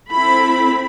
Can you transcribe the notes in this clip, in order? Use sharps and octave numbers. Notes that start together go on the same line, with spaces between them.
C4 E4 A4 B5